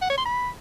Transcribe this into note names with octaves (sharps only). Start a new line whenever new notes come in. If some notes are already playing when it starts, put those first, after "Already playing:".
F#5
C#5
C6
B5